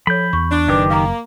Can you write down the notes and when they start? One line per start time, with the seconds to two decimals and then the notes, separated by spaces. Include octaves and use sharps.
0.07 F3 A4 C#5 B5 G6
0.33 E2 C#6
0.51 D4
0.68 F#1 D#3 G4 B4 D6
0.90 A#3 F5 A#5